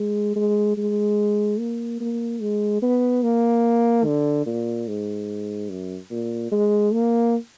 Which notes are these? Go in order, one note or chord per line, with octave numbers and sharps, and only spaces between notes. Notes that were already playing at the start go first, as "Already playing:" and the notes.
Already playing: G#3
G#3
G#3
A#3
A#3
G#3
B3
A#3
D3
A#2
G#2
F#2
A#2
G#3
A#3